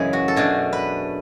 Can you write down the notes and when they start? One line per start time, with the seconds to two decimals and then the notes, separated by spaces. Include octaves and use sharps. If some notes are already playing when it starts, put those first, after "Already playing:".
Already playing: F#2 C#3 E3 G#3 C#4 E4 G#4
0.13 F#4
0.28 A4
0.36 B2 A3 D4 G#4
0.73 B4